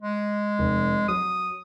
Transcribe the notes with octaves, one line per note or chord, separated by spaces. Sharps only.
G#3
F1
F#3 D#6